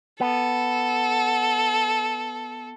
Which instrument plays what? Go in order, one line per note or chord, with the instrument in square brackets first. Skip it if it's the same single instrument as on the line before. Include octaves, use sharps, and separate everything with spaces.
[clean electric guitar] B3 [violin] A4